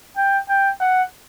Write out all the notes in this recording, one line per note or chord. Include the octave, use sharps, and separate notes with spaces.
G5
G5
F#5